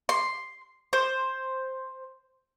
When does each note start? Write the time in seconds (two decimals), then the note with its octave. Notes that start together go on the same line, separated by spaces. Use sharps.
0.09 C6
0.93 C5